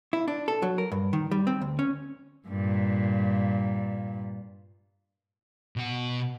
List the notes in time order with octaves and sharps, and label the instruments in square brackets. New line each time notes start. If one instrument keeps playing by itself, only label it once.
[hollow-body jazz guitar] E4
D4
A4
F#3
A#4
G2
D#3
G3
C4
D2
C#4
[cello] G2 A#2
[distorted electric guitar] B2 F#5